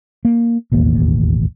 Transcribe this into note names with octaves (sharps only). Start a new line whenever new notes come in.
A#3
E1 A1 D#2 A#3